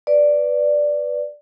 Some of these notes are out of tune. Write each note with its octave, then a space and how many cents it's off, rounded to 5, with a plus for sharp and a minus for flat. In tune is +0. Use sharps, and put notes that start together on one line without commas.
B4 +0 D5 +0